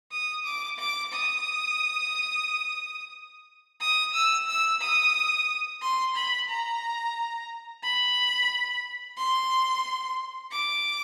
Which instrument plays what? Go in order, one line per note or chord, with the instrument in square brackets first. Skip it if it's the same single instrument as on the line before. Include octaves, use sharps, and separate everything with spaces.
[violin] D#6
D6
D6
D#6
D#6
E6
E6
D#6
C6
B5
A#5
B5
C6
D6